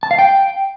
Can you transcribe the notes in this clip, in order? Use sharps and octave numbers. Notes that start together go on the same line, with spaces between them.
A5
F5
G5